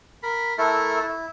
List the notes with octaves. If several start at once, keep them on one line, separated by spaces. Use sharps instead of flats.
A#4 B5
A3 E4 A4 A#4
E4